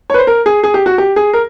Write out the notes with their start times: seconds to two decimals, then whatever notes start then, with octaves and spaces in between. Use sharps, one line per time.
0.10 C#5
0.14 B4
0.19 C5
0.27 A#4
0.46 G#4
0.64 G#4
0.74 G4
0.86 F#4
0.98 G4
1.16 G#4
1.33 A#4